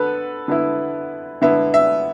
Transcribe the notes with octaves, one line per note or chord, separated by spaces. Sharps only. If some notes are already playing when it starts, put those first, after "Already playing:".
Already playing: D3 B3 A4 B4
D3 B3 E4
D3 B3 E4 E5
E5